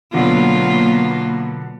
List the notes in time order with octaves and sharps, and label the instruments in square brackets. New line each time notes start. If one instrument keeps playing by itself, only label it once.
[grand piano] B2 D3 D4 [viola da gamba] F#3 F4 [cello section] A#3 B3